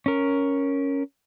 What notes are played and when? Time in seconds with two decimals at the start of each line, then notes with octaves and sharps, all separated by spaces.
0.06 C#4 A#4